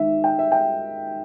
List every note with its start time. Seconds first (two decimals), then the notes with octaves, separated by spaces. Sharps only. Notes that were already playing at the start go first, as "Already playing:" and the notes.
Already playing: D#3 G#3 D#4 E5
0.24 G5
0.39 E5
0.52 G5